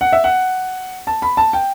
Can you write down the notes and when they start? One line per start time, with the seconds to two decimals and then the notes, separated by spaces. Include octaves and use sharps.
0.01 F#5
0.13 E5
0.24 F#5
1.07 A5
1.22 B5
1.37 A5
1.53 G5